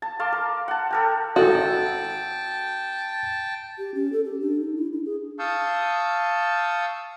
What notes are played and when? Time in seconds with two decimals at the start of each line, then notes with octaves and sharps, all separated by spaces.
0.02 A5
0.19 F5 A5 C6 D6
0.32 A#4
0.68 F#5 A5
0.91 A4 A#4 G5
1.36 G#1 F#4 A4 D#5 G5 A5
3.78 G4
3.95 C#4
4.13 A4
4.24 G4
4.40 D4
4.60 D#4
4.76 E4
4.93 D4
5.05 G#4
5.39 F5 A5 C#6 D#6 E6 G6